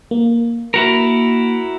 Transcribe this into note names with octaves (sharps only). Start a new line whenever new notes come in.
A#3
E4 F#4 A#4